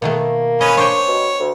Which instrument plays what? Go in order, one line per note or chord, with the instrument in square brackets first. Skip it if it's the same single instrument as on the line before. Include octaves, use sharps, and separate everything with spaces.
[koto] B2 D#3 A3 [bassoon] A#3
[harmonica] C#4 B4 [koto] D#5
[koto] D4 C5 G5 [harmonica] C#5
[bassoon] B2
D2